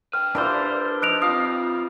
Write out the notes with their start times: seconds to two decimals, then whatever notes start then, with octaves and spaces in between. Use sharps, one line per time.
0.13 B4 G5 F6
0.35 E3 G3 D4 F4 A#4 C5
1.02 F3 D#4 F#6 D7 F7
1.22 C4 F4 F5 D#6